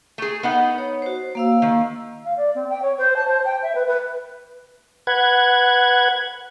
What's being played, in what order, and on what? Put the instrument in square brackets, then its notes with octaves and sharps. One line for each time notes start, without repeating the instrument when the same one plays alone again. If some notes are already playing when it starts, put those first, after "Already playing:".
[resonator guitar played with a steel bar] A3 G#4
B3 D#4 F#5
[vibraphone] C#5
F#4 C5
A#3 F5 E6
[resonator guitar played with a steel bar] D#3
[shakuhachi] F5
D5
C4
G5
C#5
C5
A5
C5
G5
E5
B4
B4
[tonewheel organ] B4 F#5 G#6